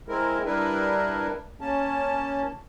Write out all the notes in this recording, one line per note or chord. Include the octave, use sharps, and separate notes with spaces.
G#3 C4 E4 A#4
G3 D4 E4 A#4 B4
A#3 C#4 A5